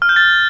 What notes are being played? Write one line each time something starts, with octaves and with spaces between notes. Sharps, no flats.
F6
G6
A6